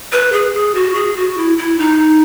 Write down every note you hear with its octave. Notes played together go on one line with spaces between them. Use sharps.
B4
G#4
G#4
F#4
G#4
F#4
E4
E4
D#4